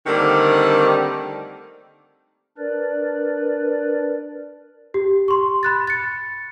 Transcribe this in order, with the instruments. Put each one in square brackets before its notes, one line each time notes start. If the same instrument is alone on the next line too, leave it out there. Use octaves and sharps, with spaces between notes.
[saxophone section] D3 D#3 G3 A3 A#3 C4
[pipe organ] D4 A#4 B4 D5
[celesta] G4
C6 C#6
B5 F#6 A6
A6 C#7